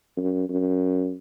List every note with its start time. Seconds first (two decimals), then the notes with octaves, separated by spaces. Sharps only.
0.17 F#2
0.49 F#2